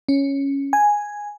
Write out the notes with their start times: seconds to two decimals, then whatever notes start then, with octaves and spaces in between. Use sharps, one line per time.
0.09 C#4
0.73 G#5